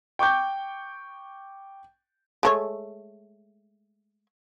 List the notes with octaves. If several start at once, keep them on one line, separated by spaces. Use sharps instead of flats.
G5 C#6 D6 G6
G#3 A3 C#5